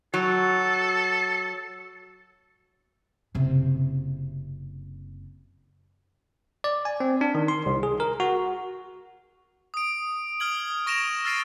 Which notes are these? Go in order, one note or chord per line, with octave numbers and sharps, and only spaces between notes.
F#3 A4
F#1 C3
D5
G#5
C4
D4
D#3
C6
C2
G#4
A#4
F#4
D#6 D7
D#6 F6 G#6 F#7
C#6 A#6 D7 E7 F7
E6 F6 A6 C7 D7 D#7